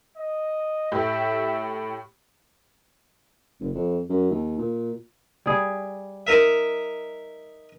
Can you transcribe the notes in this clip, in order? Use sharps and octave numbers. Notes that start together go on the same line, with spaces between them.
D#5
A2 G4 E5 G6
F#1
F2
F#2
D#2
A#2
G3 G#4
D#4 A#4 E5